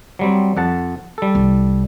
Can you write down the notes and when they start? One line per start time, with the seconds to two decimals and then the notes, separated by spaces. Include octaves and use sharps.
0.19 F#3 G3 C4
0.57 F2 F#5 A5
1.18 G3 A4
1.35 C2